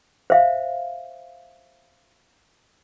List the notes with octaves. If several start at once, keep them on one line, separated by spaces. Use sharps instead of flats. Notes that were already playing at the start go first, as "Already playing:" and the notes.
C5 E5 F5